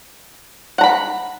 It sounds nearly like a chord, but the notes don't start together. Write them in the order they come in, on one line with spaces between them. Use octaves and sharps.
F#5 A#5 B5